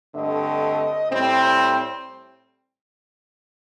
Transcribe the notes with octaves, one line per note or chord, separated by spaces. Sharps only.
G2 D3 A3 C4 D#5
A2 G3 C4